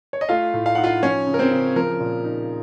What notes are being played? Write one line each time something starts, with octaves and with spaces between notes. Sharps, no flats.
C#5
D#5
A3 F4 F5
A2
F5
D#4 F#5
F4 F5
F3 C#4 C#5
C#3
A#4
C4 C5
C#3
F3 A#4
A#2
D#4